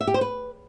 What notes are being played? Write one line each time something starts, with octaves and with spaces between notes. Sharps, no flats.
E5
G4
C5
B4